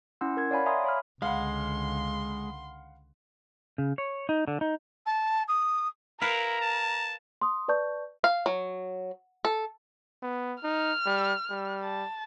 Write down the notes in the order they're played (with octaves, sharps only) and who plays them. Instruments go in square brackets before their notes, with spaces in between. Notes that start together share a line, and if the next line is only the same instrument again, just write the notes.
[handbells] C#4 E4 F#5 C6 E6
A#4 G#6
C#5 D5 F5 F#5 G#5 B5
E5 F5 G#5 A#5 C6 D#6
C#5 B5 F6
[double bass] C#2 D3 [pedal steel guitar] G#3 [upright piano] F5 F#5 B5 [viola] C6
[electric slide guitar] C#3
C#5
D#4
D3
D#4
[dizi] A5
D#6
[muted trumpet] E4 [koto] A#4 B4 F5 [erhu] A#5
[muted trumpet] A5
[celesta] C6 D#6
B4 D5 A5 C#6 G6
[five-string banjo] F5
F#3
A4
[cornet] B3
[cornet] D#4 [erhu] F6
[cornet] G3
G3
[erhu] A5